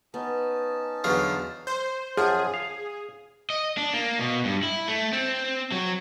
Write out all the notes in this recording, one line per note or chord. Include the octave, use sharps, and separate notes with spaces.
B3 C#4 D#4 A5
E2 D3 F#3 F5
C5
F#2 F3 G#4
F5
D#5
D4
A#3
B2
G2
E4
A3
C4
F#3